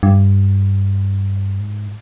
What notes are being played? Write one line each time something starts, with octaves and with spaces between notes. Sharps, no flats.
G2
G#2